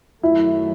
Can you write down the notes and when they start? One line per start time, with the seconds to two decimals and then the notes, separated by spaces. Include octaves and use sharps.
0.23 F#2 D#3 F#3 A3 E4